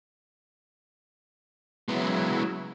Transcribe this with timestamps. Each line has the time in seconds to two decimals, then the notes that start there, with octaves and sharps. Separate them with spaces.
1.88 C#3 F#3 G#3 B3 E4